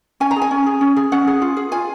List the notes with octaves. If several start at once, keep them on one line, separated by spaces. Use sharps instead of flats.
C#4 G#5
A#5
G#4
G#5
C#4
G#4
C#4
G#4
C#4 F#5
G#4
F4
G#4
F4 G#5